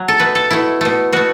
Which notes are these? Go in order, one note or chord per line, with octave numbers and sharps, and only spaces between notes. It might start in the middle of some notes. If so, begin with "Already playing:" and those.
Already playing: F#3
A4
B2 A3 B4
A4
B2 A3 E4
B2 A3
B2 A3 F#4